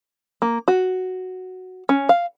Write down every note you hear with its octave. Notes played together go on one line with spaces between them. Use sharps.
A#3
F#4
C#4
F5